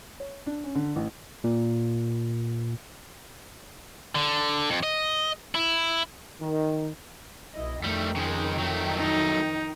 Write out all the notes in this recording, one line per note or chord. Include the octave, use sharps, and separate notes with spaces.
C#5
D4
C#4
D3
A1
A#2
D3
F2
D#5
E4
D#3
B1 E4 D#5
F2 D#3 G3 A3 G5
C#3 G#3
F#3 A3
D#4